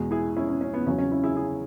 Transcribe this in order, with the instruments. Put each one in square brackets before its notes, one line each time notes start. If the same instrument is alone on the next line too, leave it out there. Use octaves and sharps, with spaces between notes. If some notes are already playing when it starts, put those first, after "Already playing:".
Already playing: [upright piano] E2 B2 G#3
E4 G#4
C#4 E4
C#4
C#4
B3
E2 C#3 F#3 C#4
C#4
C#4 E4
E4 G#4
E4 G#4